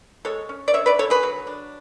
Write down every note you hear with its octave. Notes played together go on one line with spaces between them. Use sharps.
G#3 A4 C#5
C#4
D5
D3 C#5 E5
B4 D5
D3 A4 C#5
G#4 B4
F#3
D4